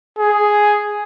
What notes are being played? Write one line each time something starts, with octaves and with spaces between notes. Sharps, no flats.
G#4